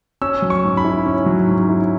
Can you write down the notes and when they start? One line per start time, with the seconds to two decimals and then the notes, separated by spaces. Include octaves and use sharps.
0.22 C#4 E6
0.42 F#3
0.50 C#6
0.64 G#2
0.77 B5
0.84 E4
1.06 C#4
1.26 F#3
1.47 G#2
1.69 E4